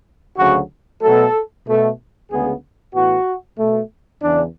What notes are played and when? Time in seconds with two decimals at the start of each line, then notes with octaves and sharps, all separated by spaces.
0.38 D2 C#3 F#3 F#4
1.03 B2 F#3 A3 A4
1.67 B2 A3
2.31 D2 C#3 G#3 B3 G#4
2.94 A2 E3 B3 F#4
3.59 B2 A3
4.23 E2 C#3 E3 D4